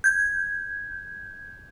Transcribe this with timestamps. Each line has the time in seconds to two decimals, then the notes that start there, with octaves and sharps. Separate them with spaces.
0.04 G6 G#6